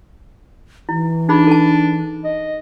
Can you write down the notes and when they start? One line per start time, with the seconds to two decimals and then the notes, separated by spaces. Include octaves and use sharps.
0.89 E3 E4
1.29 D4 D#4 G#4 B5
1.47 A4 A5
2.24 D#5